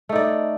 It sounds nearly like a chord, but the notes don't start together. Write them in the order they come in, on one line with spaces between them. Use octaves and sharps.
A3 D#4 D5